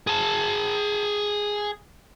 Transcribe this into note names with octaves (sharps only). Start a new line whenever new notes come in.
G#4 A5